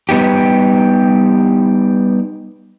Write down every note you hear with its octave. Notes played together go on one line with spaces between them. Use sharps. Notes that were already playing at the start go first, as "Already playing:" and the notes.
G3 B3 D#4 G4